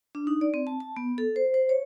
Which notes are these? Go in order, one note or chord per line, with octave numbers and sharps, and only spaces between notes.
D4
D#4
D5
C4
A5
A5
B3
A4
C5
C5
C#5